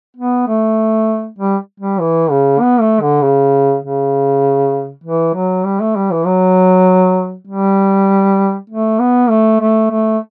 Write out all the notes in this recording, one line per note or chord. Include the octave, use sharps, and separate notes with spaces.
B3
A3
G3
G3
E3
C#3
B3
A3
D3
C#3
C#3
E3
F#3
G3
A3
G3
E3
F#3
G3
A3
B3
A3
A3
A3